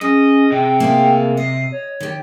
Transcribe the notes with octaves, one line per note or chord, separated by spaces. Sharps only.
G#3 C#4 D#5
C3 G5
A#3 F4 G#4
D#5 C7
C#5
D#3 G4